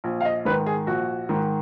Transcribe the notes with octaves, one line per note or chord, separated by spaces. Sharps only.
A#1
F5
D#5
G#2 D#3 B4
G#4
A#1 F#4
G#2 D#3